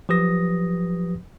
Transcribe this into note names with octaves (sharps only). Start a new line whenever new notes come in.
F3 F#3 G4 B4 D#6 A#6